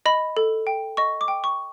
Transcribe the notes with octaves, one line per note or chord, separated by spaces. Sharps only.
D#5 B5
A4
G5
D#5 C#6
D6
G5
C#6